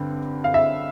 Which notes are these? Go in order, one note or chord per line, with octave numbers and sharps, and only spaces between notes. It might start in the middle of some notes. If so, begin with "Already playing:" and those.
Already playing: G2 D3 C4
F5
E5